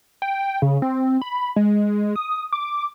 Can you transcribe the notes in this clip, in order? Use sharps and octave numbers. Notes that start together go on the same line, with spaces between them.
G5
C#3
C4
B5
G#3
D#6
D6